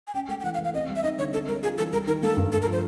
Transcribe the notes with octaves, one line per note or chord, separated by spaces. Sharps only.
G#5
C#4 G5
A3 G5
G5
E3 F#5
F5
E3
F5
C4 D#5
G3
E5
D#4 D#5
D3 C#5
C4 A4
G3 A#4
F4 G#4
E3 A4
G3 A#4
D#3 A#4
A#3 A4
G2
A3 A4
A#4
F3 C5